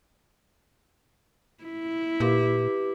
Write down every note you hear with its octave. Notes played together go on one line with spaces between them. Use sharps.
E4
A#2 G4 B4 D6